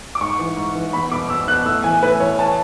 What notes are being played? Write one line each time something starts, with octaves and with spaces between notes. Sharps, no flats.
D6
G#2 C#6
E3
G#2
E3
E2 B5
B2 D6
E2 E6
B2 F#6
A2 E6
E3 G#5
A2 B4
E3 C#5
A5